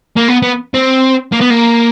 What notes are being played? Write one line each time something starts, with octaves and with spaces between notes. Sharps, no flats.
A#3
B3
B3
C4
A#3
B3
A#3